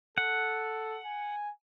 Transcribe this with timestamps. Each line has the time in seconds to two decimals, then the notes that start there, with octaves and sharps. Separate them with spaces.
0.18 A4 F#5
1.05 G#5